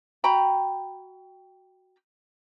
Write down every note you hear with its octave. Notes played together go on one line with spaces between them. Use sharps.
F#4 G5 A#5 B5